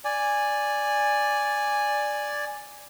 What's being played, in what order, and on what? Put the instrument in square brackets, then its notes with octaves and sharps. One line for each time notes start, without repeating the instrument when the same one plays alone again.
[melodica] D5 G#5